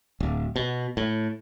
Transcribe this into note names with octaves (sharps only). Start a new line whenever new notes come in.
D1
B2
A2